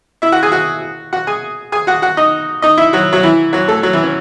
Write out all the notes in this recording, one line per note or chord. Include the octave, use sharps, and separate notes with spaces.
E4 E5
F#4 F#5
G#4 G#5
F#4 F#5
F#4 F#5
G#4 G#5
G#4 G#5
F#4 F#5
F#4 F#5
D#4 D#5
D#4 D#5
E4 E5
F#3 F#4
F#3 F#4
E3 E4
F#3 F#4
A3 A4
F#3 F#4
E3 E4
C#4